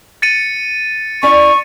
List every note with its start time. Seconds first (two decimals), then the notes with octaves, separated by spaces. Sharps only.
0.22 A6 C#7 D#7
1.23 C#4 E4 D5 C#6